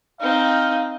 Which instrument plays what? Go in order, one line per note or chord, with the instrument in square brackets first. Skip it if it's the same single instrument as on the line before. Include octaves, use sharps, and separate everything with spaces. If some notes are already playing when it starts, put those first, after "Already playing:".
[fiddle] C4 D#4 [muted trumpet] F5